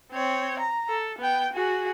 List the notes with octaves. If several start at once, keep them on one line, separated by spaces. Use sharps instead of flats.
C4 C#5
A#5
A4
B3 G5
F#4 G#4